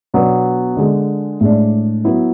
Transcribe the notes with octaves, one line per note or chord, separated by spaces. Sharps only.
B2 F#3 B3 D4
D3 G#3 D4
A2 G#3 D4
F#3 B3 E4